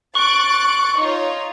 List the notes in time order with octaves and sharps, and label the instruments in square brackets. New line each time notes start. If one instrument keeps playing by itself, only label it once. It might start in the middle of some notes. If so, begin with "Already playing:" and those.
[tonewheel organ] C#6 [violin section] F#6 A6 D7
[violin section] D#4 F4 C#5